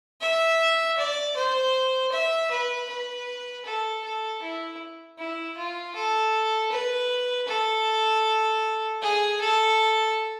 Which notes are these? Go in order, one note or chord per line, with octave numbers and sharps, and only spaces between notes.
E5
D5
C5
E5
B4
B4
A4
A4
E4
E4
F4
A4
B4
A4
G#4
A4